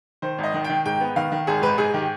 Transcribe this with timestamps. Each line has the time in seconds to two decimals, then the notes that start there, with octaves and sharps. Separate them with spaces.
0.22 D#3 C5
0.38 G#1
0.43 D#5
0.54 D#3
0.64 D#3 G5
0.86 G#2 G5
1.00 B3
1.16 D#3 F5
1.32 D#3
1.47 G#1 G#4
1.62 G#2 B4
1.78 G#2 G#4
1.94 D#3 G4